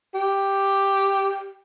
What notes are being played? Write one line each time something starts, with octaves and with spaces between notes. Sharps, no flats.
G4